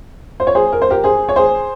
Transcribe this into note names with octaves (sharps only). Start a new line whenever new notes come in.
C5
C#5
G#4 C5
A#4
C5
G4 A#4
G#4 C5
C#5
G#4 C5